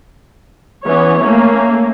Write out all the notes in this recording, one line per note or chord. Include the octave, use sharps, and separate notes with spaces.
E3 B3 C#4 C#5
A3 A#3 C#4